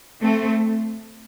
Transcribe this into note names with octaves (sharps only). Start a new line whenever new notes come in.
A3 C4